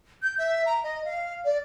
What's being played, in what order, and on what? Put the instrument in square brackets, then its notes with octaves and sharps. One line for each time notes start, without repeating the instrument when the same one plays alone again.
[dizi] G6
E5
A#5
D#5
F5
D5